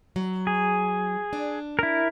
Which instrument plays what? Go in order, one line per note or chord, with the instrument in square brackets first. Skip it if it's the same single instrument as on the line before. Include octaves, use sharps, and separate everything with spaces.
[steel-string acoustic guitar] F#3
[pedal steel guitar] G#4
[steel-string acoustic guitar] D4
[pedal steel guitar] E4 A#4